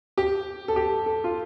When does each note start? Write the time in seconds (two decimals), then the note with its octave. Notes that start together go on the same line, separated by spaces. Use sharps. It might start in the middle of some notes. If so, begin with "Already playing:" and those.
0.18 G4
0.68 A4
0.76 G4
1.06 A4
1.24 F4